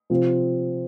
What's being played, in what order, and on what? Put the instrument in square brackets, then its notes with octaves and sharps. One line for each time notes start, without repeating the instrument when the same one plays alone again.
[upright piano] C3 F3 C4 F4